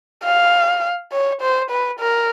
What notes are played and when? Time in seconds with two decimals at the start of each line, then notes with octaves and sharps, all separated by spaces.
0.24 F5
1.12 C#5
1.42 C5
1.71 B4
2.00 A#4